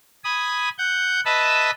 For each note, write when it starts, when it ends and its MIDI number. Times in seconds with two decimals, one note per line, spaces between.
0.24 0.69 80
0.24 0.69 83
0.24 0.69 87
0.78 1.20 78
0.78 1.20 91
1.25 1.71 71
1.25 1.71 75
1.25 1.71 76
1.25 1.71 81
1.25 1.71 83